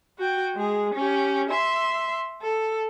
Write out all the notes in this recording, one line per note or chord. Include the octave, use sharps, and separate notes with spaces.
F#4 G5
G#3 G#4
C#4 G4
E5 C6
A4